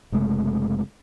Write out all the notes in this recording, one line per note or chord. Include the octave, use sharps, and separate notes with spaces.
F#1 C3 G#3 A3